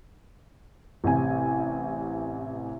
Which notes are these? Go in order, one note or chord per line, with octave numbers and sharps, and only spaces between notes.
A1 C3 G#5